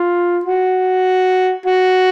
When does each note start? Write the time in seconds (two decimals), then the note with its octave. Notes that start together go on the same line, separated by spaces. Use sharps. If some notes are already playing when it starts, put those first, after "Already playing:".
Already playing: F4
0.45 F#4
1.66 F#4